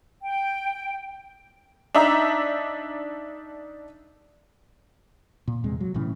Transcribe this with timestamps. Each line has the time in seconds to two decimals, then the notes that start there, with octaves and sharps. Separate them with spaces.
0.23 G5
1.94 D4 D#4 E5 A#5
5.48 A#2
5.64 E2 C3 G#3
5.80 F#3
5.94 B1 A2 C#3 E3